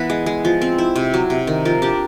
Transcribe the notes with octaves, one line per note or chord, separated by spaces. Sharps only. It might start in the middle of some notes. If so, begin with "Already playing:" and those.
Already playing: E3 B3 B4
G#3
G#3
F3
C4
E4
C3
F#3
C3
D#3
F3 A#4
D4 G4